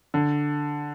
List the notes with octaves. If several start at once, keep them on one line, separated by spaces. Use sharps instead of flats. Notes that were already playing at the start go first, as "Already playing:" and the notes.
D3